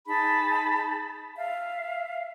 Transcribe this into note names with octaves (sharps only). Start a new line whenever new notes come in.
D#4 G#4 A5 B5
E5 F5